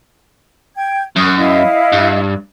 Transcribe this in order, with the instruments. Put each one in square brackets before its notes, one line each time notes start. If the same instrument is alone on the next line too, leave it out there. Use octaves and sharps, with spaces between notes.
[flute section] G5 G#6
[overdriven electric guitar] F#2 [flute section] C#6 D#6
[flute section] E4 D#5 F5
[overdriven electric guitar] G2